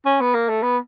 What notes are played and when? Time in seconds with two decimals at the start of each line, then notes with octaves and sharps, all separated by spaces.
0.05 C#4
0.21 B3
0.34 A#3
0.49 A3
0.63 B3